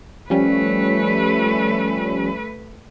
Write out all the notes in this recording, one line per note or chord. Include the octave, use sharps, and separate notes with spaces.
F3 G3 A3 C#4 B4